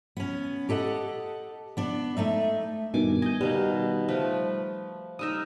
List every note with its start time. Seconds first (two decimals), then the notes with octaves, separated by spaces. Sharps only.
0.17 B3 C#4
0.69 G4 A4 D#5 F#5
1.77 B3 D4
2.17 A3 D#4 E5
2.94 G2 B2 D#3 G#5 D6
3.22 D#5 G#5 G6
3.41 B2 D#3 G3 F5
4.08 F3 A3 B4
5.19 G3 D#4 A#4 D#6 E6